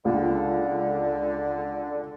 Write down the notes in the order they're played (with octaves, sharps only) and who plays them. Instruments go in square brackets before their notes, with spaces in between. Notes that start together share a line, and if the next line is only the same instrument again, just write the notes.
[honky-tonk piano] C#2 [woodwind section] D3